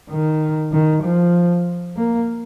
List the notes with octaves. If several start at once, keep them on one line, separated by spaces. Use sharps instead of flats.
D#3
D#3
F3
A#3